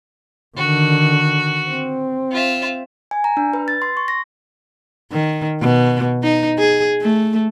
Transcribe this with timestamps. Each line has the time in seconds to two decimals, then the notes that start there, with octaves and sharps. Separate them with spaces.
0.57 D3 D#3 F#4
1.69 C4
2.32 F4 E5
3.11 G#5
3.24 A#5
3.37 D4
3.53 B4
3.68 A6
3.82 C6
3.97 C#6
4.08 A#6
5.12 D#3
5.61 B2
6.23 D#4
6.58 G#4
7.01 A3